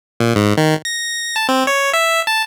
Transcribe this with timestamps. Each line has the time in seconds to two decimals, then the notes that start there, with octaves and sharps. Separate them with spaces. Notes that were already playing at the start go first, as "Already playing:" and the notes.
0.20 A#2
0.36 G#2
0.57 D#3
0.85 A#6
1.36 A5
1.49 C4
1.67 C#5
1.93 E5
2.27 A5